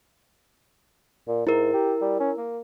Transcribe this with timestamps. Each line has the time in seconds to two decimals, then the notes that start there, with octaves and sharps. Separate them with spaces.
1.28 A#2
1.47 G#2 E4 A#4
1.74 G4
2.02 G3
2.20 C#4
2.37 A#3